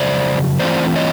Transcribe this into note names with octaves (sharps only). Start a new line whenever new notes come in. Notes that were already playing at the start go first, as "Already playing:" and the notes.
Already playing: F2 C#3 F#3 C5 D5
E3 A3 C4 F4 C5 D5
C#5 D#5